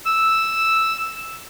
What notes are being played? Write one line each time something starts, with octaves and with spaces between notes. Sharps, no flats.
E6